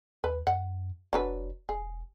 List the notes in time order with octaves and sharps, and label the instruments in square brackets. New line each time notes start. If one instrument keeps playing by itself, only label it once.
[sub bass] D#2 [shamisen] B4
[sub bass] F#2 [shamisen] F#5
[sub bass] F1 [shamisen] F#3 D4 B4
[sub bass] E1 [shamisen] G#4